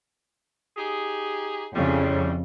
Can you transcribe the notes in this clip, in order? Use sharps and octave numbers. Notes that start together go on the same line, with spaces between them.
D#4 G4 G#4
F2 A2 C#3 G3